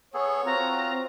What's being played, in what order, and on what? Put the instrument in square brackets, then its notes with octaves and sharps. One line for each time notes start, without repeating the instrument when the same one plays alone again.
[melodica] B3 G#4 A4 [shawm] C#5
[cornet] C4 [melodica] F4 F#4 [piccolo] A#5